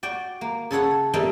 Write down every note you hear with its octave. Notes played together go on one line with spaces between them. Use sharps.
F#4 D5 G5
A#3
C#3 A4 C#5 F#5 B5
G3 A3 A#3 C4 D#4 F4